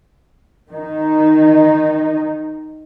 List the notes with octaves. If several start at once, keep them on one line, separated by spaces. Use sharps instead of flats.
D#3 D#4